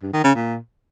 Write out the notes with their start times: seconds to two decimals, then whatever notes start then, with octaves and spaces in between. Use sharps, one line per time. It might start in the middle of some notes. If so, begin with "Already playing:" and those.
0.02 G2
0.13 D#3
0.24 C#3
0.35 A#2